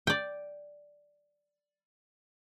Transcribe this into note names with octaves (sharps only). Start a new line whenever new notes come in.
D5 G5